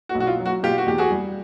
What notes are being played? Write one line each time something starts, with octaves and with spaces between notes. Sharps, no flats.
F#4
B1
F#4
F4
F#3
F#4
B2 F4 G4
F#4
E2 G4
F#4 G#4
G3